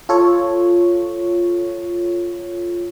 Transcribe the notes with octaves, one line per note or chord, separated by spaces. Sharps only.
F4 A4 C#5